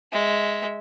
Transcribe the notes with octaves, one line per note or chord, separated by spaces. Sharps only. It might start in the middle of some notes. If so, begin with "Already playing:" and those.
G#3 E5